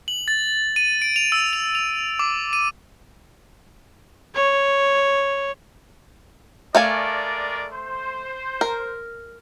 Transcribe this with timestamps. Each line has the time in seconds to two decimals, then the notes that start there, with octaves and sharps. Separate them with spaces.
0.08 F#7
0.28 A6
0.76 D#7
1.02 D7
1.16 F7
1.32 E6
1.53 F7
1.75 F7
2.19 D6
2.53 D#7
4.35 C#5
6.75 G#3 A3 A#4 D5 F5 G#5
7.73 C5
8.61 A#4